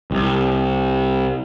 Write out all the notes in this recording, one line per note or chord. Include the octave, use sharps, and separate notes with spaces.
C2